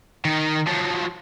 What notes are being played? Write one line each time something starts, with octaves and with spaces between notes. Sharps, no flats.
D#3 D#4
F3 F#3